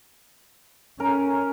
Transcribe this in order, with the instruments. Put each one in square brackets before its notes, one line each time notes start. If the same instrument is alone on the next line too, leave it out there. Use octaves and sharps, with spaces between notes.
[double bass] C#4 [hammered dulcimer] A#4